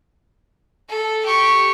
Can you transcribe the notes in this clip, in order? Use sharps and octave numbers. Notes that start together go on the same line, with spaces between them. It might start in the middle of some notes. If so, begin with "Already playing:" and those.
A4
G4 C#6